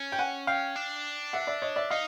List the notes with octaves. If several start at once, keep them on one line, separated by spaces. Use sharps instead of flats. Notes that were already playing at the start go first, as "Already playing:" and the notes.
Already playing: C#4
G5
F#5 G#5
F5 G5
D4
E5 F#5
D5 E5
C#5 D#5
D5 E5
D#4 D#5 F5